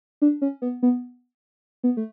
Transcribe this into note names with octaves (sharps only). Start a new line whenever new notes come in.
D4
C#4
B3
B3
B3
A3